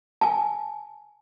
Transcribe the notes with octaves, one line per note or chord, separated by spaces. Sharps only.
G#5 A5